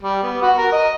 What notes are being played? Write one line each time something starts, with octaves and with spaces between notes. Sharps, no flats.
G3
B3
F#4
A#4
D#5